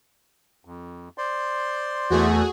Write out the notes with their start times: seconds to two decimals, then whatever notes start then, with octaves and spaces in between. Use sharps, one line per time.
0.65 F2
1.18 C5 D5 C6
2.10 E2 A3 F#4 G#4